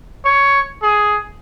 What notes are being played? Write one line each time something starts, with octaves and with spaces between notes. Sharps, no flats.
C#5
G#4